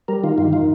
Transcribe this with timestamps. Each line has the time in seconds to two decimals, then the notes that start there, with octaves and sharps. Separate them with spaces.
0.08 G3 A#4
0.24 D#3 F4
0.38 G2 F4
0.53 D#3 F4